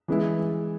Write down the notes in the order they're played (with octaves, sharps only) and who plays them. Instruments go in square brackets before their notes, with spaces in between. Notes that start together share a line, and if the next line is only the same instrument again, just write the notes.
[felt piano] E3 G#3 B3 E4